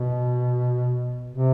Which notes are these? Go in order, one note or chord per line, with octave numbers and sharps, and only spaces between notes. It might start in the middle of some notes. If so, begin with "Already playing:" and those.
Already playing: B2
C3